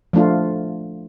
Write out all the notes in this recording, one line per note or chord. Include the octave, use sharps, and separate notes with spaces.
F3 A3 D4 F4